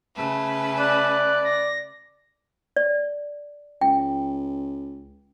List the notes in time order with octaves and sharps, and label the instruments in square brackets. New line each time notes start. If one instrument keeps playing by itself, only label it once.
[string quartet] C#3 A3 B4
[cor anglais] D5 [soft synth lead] F#6
[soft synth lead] A#6
[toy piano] D5
[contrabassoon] C#2 [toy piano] G5